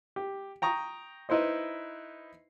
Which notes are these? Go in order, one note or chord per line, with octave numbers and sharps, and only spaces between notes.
G4
G5 A#5 C#6 D#6
D#4 E4 B4 C5 D#5